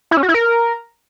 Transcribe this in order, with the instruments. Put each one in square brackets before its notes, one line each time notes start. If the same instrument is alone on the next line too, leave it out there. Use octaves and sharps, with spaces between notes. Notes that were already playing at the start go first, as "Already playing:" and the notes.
[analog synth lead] E4
C#4
F#4
E4
A#4